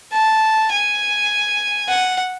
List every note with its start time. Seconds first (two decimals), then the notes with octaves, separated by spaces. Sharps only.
0.13 A5
0.71 G#5
1.88 F#5